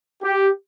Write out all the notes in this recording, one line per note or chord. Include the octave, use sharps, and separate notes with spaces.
G4